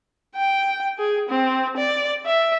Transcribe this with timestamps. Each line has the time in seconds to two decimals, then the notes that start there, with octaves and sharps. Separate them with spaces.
0.36 G5
0.98 G#4
1.29 C4
1.77 D5
2.26 E5